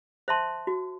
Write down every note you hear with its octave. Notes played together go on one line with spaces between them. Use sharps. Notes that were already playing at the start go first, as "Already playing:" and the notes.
C5 E5 A5 C6
F#4